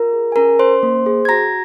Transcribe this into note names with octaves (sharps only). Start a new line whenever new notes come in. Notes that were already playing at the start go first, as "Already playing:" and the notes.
Already playing: F4 A#4 A#5
G#4
G#5
C#4 A#4 A#5
C#4 C5 C6
A#3
G#4
G#6
F#4 A#5 A#6